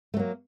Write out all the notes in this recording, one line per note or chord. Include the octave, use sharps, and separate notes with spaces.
F#3 A3 A#3